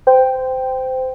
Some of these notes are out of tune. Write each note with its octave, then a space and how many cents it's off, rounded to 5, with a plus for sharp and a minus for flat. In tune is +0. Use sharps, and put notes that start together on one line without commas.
C5 -20 G5 +0